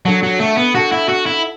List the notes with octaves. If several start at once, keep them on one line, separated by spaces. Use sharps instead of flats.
F#3 D4 A4 F#5 A5
F#3
A3
B3
D4 F#4 A4 F#5 A5
E4
F#4
E4